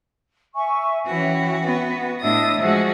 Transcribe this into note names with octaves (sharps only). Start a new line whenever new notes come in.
E5 G#5 C#6
E3 C#4 F#4 E5 G5
B3
A2 D4 D#5 E5 D#6 E6
F3 G#3 F#4